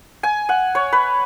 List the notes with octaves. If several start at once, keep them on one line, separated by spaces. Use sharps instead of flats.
G#5
F#5
C#5
B4